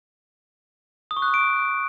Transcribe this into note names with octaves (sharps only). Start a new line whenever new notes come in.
D#6
C#6
F#6
D#6
D7